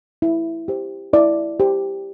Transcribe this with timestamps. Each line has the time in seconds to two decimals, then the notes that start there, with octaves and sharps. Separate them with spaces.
0.22 E4
0.68 G4 C5
1.13 E4 D5
1.60 G4 C5